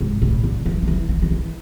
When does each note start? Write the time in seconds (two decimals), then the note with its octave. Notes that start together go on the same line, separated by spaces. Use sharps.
0.01 G#2
0.22 A2
0.44 D3
0.66 E3
0.82 F3
0.87 E3
1.09 E3
1.22 D#3
1.31 E3